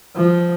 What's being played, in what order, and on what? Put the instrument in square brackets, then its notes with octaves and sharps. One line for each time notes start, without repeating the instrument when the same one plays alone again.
[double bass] F3